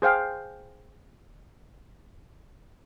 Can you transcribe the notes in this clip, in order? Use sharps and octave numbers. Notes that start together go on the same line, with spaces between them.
G#4 C5 F5 G5